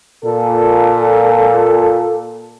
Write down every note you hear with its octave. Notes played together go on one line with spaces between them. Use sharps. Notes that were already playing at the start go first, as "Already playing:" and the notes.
A#2 A4